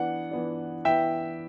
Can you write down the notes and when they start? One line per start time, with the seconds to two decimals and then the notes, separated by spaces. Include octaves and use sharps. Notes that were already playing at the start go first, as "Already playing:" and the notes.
Already playing: E3 B3 D4 F#5
0.31 E3 B3 D4
0.85 E3 B3 D4 E5 G5